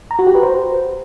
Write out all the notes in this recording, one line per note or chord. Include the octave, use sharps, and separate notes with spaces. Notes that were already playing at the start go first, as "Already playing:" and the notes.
A#5
F#4
G4
B4
C5